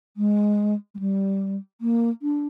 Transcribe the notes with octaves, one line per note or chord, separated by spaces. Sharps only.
G#3
G#3
G3
A#3
D4